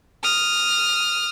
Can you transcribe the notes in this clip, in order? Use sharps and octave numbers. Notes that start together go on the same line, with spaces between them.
D#6 F6